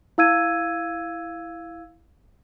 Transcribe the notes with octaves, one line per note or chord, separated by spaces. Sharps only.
E4 F5 E6 G#6 D#7